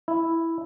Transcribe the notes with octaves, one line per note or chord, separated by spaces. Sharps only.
E4